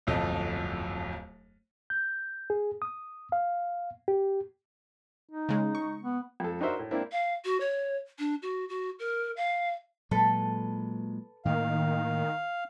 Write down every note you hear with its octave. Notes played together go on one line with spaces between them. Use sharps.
D1 G1 F2 A4 D#5
G6
G#4
D#6
F5
G4
D#4
C#3 G#3
C#6
B3
F2 A4
D4 D#4 F#4 A#4 C5 E5
A2
A#3 C4 D4 E4
F5
F#4
C#5
D4
F#4
F#4
A#4
F5
A#2 F#3 G#3 A4 B4
A2 D#3 A#3 F5